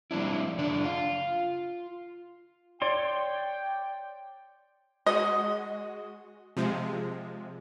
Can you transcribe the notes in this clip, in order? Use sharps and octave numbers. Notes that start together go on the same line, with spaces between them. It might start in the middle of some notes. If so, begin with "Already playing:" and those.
F3 G3 C4 D4 E4
F#2 C#3 D4 D5
F4
C#5 D5 G5 C6
G#3 F#4 D#5
C3 F3 G#3